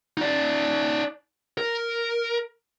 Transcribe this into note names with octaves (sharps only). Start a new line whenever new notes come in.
D#4 D5
A#4